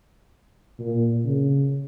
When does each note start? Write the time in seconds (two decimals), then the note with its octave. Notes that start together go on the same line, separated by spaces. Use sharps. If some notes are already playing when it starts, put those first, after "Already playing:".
0.80 A#2
1.24 C#3